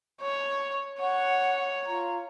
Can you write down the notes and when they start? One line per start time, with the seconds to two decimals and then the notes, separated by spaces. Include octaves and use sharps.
0.21 C#5
1.00 C#5 F#5
1.86 F4 A#5